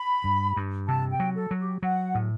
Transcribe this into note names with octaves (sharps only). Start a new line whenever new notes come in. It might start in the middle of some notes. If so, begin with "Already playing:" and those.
Already playing: B5
G2
G2
C3 A5
G5
F#3
A4
F#3
G4
F#3 F#5
A2